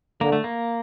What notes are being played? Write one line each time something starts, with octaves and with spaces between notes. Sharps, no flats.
D3 A#3
A3
A#3